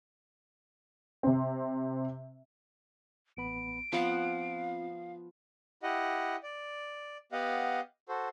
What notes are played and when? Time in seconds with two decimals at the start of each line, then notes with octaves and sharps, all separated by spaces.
1.23 C3 C4
3.37 A1 B3 B5 D7
3.93 F3 B3 C4 F4 F5 F#5
5.83 E4 G4 D#5 F#5
6.43 D5
7.32 B3 G4 D#5 F5 F#5
8.09 F#4 A4 C5